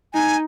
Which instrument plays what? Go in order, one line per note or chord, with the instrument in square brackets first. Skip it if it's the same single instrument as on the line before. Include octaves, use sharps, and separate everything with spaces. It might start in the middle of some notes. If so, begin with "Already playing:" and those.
[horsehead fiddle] D#4 [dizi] G#5